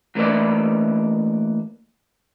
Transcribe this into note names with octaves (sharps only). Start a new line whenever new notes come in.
E3 A3 A#3 B4 D5